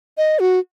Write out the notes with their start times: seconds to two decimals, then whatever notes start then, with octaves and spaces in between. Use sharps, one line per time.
0.17 D#5
0.39 F#4